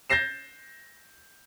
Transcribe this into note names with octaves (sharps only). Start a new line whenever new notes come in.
G6 A6 A#6 C7 E7